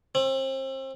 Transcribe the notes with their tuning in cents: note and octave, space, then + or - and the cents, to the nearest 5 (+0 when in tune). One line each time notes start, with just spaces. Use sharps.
C4 +35